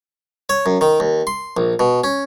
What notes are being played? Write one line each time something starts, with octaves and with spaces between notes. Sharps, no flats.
C#5
F#2
D#3
D#2
C6
A#1
B2
C#4